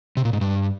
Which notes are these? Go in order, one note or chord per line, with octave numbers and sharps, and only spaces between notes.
C3
A#2
G#2
G2